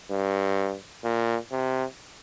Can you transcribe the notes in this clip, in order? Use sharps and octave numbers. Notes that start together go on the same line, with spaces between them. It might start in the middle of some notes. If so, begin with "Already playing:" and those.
G2
A#2
C3